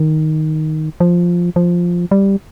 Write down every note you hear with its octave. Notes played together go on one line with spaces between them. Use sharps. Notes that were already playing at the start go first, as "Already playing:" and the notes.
Already playing: D#3
F3
F3
G3